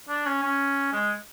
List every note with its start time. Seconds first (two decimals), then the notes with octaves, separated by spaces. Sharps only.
0.08 D4
0.25 C#4
0.42 C#4
0.93 G#3